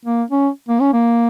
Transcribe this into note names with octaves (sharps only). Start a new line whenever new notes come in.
A#3
C#4
A#3
C#4
A#3